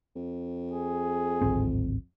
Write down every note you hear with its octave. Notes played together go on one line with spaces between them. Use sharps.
F2
G#4
D1 G#1 C4